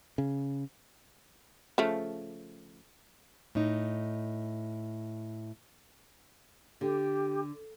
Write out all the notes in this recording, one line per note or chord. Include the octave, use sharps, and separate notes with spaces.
C#3
C#3 F3 A3
A2 D#4
D3 G4